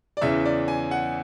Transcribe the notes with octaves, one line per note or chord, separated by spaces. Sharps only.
D5
E2 C#3 E3 E5
D5
G#5
F#5